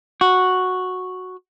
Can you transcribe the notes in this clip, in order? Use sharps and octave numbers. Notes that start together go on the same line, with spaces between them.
F#4